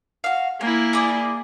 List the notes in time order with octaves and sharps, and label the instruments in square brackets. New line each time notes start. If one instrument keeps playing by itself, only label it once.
[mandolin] F#4 F5
[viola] A#3 E4 [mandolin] G#5
[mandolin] G#4 D5